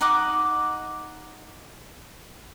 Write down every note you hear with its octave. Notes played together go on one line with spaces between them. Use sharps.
D#4 D#5 F#5 D6